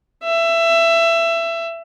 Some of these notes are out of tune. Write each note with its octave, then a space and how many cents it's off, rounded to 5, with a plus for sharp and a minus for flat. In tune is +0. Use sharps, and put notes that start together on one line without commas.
E5 +20